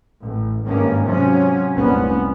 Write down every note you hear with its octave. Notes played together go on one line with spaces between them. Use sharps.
A1
G#1 G2 D#3 A#3 C#4
C3 F3 F#3 C#4
F1 C2 A#2 B3 C#4